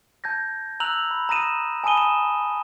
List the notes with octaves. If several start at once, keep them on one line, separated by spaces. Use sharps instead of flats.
A5 G6 G#6 A#6
A#5 E6 F#6 F7 F#7
B5
A#5 D#6 A#6 D#7 E7
G#5 A5 B5 D#6 D#7 G7
E7